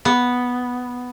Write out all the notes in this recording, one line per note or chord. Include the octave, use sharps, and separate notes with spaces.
B3